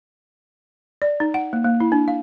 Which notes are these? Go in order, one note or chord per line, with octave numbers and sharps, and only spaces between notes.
D5
D#4
F#5
A#3
A#3
E4
D4
F5